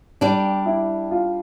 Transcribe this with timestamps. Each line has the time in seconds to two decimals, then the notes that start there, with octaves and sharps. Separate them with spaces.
0.21 G3 D4 G4 D5
0.66 E4
1.11 F4